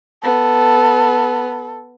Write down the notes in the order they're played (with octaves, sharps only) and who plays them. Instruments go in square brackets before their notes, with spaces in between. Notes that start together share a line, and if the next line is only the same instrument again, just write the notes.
[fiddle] B3 [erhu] A4